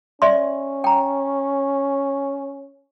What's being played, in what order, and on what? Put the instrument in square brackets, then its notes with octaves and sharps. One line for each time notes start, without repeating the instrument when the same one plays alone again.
[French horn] C#4 [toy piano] D5 E5 C6
[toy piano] G5 A#5